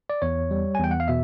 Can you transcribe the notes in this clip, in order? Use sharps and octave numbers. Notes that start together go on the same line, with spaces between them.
D5
E2 C#5
G3
G#5
E2 G5
F#5
F5
B2 E5